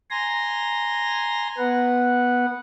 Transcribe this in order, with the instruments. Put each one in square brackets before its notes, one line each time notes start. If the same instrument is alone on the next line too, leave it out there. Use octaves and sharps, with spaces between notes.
[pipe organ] G#5 A#5 C6 A#6
B3 B4 F#5